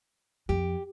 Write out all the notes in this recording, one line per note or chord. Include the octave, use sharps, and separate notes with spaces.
F2 G4